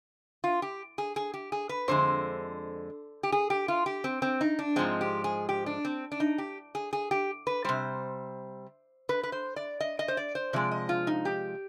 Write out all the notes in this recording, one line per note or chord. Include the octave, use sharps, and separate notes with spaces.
F4
G4
G#4
G#4
G4
G#4
B4
F2 D3 G#3 C5
G4
G#4
G4
F4
G4
C4
C4
D#4
D4
G#2 F3 G#3 C4
G4
G#4
G4
D4
C4
D4
D#4
G4
G#4
G#4
G4
B4
C3 G3 C5
B4
B4
C5
D5
D#5
D#5
C5
D5
C5
C3 F3 G#3 D5
D#5
F4
D#4
G4